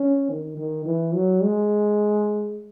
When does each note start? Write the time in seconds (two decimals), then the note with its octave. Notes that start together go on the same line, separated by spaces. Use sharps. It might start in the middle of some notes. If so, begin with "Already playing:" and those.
Already playing: C#4
0.30 D#3
0.57 D#3
0.86 E3
1.15 F#3
1.43 G#3